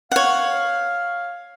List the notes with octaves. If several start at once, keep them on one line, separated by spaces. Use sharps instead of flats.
C#5 F5 F#5